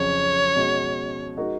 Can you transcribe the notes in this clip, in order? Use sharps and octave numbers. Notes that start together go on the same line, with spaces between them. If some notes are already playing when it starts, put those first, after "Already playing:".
Already playing: F2 C#3 F#3 C#4 C#5
B2 G#3 C#4
G#3 D#4 F#4 A#4